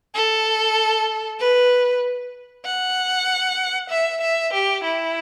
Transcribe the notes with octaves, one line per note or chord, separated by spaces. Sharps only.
A4
B4
F#5
E5
E5
G4
E4